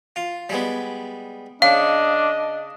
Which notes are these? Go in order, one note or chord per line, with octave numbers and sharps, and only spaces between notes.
F4
G3 G#3 B3
C#3 D4 D#5 F5